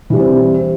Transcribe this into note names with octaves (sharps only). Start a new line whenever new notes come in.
E3 G3 C4 E4